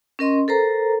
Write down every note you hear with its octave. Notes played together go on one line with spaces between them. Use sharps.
C#4 A#4 D#5 C6
A4 A#4 C5 A#5